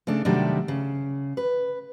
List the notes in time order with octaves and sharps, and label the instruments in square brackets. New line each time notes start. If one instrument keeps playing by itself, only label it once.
[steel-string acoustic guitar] C#3 A3 D4
C3 D#3 F#3 G3 A3 D4
C#3
B4